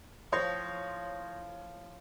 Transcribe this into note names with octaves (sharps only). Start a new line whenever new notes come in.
A2 F3 C5 C#5 C6 D#6 G6 A#6